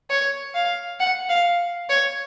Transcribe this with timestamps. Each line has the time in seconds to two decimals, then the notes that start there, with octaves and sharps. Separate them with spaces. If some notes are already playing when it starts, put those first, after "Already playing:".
0.10 C#5
0.54 F5
1.00 F#5
1.29 F5
1.89 C#5